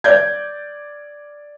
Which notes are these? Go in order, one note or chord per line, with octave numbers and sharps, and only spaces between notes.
D5 G6 G#6